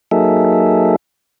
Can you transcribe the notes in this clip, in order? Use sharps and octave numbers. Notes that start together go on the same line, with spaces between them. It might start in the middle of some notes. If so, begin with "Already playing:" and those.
F#3 A#3 D#4 G#4 A4 E5